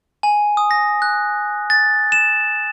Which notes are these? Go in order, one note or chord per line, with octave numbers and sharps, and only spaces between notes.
G#5
D#6
A#6
F#6
A6
E7